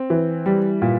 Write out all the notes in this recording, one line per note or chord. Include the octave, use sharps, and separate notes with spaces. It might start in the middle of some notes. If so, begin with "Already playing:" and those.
Already playing: C4
E3
G3
A#2